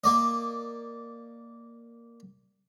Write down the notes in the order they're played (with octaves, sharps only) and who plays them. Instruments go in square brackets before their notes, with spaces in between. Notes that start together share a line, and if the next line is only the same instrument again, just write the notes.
[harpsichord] A#3 D5 D#5